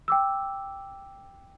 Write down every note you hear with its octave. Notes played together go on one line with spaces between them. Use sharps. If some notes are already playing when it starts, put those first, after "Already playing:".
G5 D6 E6